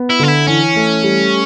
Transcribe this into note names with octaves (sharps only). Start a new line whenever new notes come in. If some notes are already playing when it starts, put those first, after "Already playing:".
Already playing: B3
E4
D3 F4
E4
E3 C#4
A3
G3